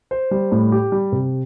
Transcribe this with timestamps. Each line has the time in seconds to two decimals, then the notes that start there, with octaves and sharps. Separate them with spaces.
0.11 C5
0.31 G3
0.52 A2
0.72 G4
0.92 G3
1.12 C3